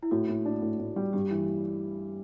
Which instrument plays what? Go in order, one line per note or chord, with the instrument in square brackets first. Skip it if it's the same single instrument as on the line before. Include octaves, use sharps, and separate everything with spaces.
[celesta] E4
[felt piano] A2 [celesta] F#4
[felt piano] A2
D4
A2
A2
G3
[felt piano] G2 [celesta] G4
[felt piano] E3